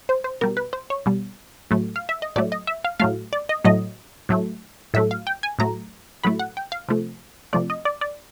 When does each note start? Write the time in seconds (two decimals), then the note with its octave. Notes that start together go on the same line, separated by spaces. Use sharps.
0.09 C5
0.24 C5
0.41 B2 G3 A#4
0.57 B4
0.73 C5
0.90 C#5
1.06 B2 G3
1.71 A2 F#3 A3
1.96 F5
2.09 E5
2.22 D#5
2.36 A2 F#3 A3 D5
2.52 D#5
2.67 E5
2.85 F5
3.00 A2 F#3 A3 F5
3.33 D5
3.49 D#5
3.65 A2 F#3 A3 D#5
4.29 A2 F#3 A3
4.94 A2 F#3 A3 E5
5.11 F5
5.27 G5
5.43 G#5
5.59 A2 F#3 A3 A#5
6.24 A2 F#3 A3 B5
6.39 F#5
6.57 G5
6.72 F5
6.89 C3 F3 A3
7.53 C3 F3 A3 D5
7.70 D#5
7.85 D5
8.01 D5